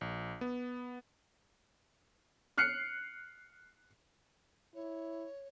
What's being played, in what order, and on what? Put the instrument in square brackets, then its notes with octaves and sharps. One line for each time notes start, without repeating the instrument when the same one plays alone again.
[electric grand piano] A#1
B3
[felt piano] F6 F#6 C7 C#7
[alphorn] E4 [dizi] C#5